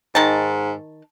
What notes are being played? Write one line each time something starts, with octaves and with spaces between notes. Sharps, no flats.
G#2 D#3 A5